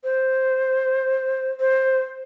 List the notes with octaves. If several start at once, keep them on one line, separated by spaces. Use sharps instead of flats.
C5
C5